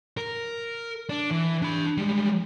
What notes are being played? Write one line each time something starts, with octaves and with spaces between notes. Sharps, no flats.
A#4
D4
E3
D4 B5
G3 G#3